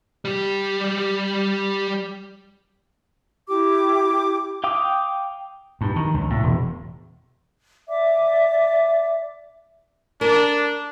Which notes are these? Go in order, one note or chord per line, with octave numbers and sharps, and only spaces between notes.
G3 G4
E4 G4 D6
F5 G5 D6 D#6
G2
D#3
C#2
A2
E1
D5 E5 D6
D4 A#4